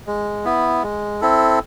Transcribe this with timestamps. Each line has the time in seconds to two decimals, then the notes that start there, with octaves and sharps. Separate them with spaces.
0.07 G#3
0.45 B3 E4
0.83 G#3
1.21 C4 E4 A4